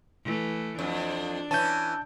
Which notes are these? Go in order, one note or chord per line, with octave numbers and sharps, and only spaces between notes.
E3 A3
F2 D4
E3 C#4 A5 G6